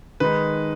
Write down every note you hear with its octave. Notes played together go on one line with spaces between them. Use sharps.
D#3 G#3 D#4 B4